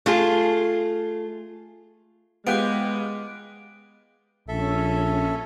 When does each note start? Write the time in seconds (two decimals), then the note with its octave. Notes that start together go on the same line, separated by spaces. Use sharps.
0.06 A3 F4 G#4
2.47 G#3 B3 F4 G4 D6 F#6 D7
4.48 A#1 C#4 A4 E5